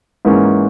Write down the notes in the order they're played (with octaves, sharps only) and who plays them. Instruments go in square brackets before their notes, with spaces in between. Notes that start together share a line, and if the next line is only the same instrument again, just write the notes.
[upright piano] G#2 E3 A#3 C#4